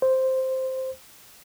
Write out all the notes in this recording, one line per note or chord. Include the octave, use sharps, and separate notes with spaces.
C5